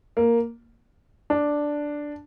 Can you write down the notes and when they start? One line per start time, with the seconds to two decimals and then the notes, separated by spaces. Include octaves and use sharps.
0.17 A#3
1.30 D4